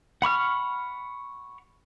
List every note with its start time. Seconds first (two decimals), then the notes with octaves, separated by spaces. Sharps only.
0.22 F#5 B5 C#6 F6